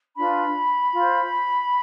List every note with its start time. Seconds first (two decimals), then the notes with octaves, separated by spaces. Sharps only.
0.16 D4 F4 B4 B5
0.92 F4 C5